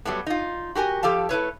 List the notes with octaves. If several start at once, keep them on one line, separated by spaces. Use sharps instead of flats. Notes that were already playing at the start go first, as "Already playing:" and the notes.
F#3 G3 A3 B3
D#4 F4
F#4 G4 A#4 G#5
F3 G4 A4 F5 A5
A3 E4 B4 C#5